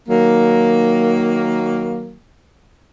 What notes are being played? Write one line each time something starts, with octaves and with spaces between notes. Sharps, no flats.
D#3 F#3 A#3